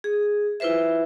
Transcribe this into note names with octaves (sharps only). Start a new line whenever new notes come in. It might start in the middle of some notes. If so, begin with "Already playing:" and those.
G#4
E4 F4 B4 C5 E5